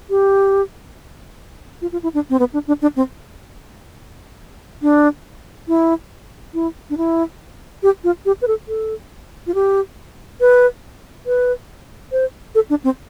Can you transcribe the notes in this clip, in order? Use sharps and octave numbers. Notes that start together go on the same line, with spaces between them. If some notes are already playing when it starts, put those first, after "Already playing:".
G4
F4
F4
E4
D4
C4
B3
D4
D4
D4
C4
D4
E4
E4
D4
E4
G4
F4
G4
B4
A4
A4
F4
G4
B4
B4
C5
A4
D4
C4